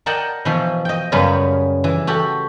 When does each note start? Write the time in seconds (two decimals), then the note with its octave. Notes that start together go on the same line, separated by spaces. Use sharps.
0.06 A#4 D5 D#5 F#5 G5 A5
0.45 B2 E3 F3
0.85 D#5 G5
1.12 F#2 C#3 G3 B3 F5
1.84 E3
2.07 F#4 G4 A4